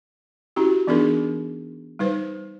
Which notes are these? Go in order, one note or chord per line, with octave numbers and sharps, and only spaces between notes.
C#4 E4 F#4 G4
E3 B3 D4 D#4 G#4 A#4
G3 D#4 B4 C5